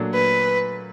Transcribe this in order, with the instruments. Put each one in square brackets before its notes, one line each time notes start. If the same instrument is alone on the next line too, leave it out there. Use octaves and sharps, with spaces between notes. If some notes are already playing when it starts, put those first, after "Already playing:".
Already playing: [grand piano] A#2 F#3 A3 D4
[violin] B4